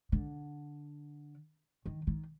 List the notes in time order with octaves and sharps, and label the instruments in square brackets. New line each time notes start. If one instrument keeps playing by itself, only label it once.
[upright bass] D3
D#3
D#3